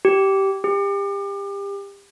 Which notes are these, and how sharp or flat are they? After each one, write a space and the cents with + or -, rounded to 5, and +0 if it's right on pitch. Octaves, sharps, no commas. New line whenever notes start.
G4 -15
G4 +30